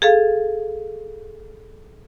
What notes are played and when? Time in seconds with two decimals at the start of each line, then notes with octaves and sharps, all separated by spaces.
0.02 G#4 A4 F5